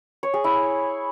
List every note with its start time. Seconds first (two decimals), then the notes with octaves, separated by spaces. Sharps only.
0.23 C#5
0.34 G#4
0.44 E4